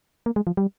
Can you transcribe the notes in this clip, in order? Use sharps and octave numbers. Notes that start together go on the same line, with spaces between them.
A#3
G#3
F3
G3